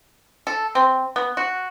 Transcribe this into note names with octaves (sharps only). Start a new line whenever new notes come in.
A4
C4
B3
F#4